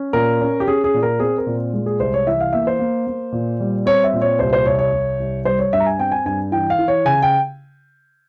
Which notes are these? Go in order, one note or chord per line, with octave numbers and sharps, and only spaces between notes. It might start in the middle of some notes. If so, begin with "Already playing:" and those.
Already playing: C#4
A#2 A#4
C#4
G4
C#4 G#4
G#4
A#2
A#4
C4 G#4
A#4
A#2
G#3
G#4
C2 C5
C#5
E3 E5
F5
A#3 E5
C5
A#3
A#3
A#2
G3
C4 C#5
E5
A#2
C#5
C2 C5
C5
C2 C#5
C#5
C2
C2
G3 C5
C#5
G2 E5
A#5
G#5
C4 G5
G#5
G2 G#5
E3 G5
F5
E3
C#5
C#3 G#5
G5